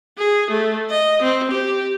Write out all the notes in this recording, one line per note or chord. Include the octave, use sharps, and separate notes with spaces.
G#4
A3
D#5
C4
G4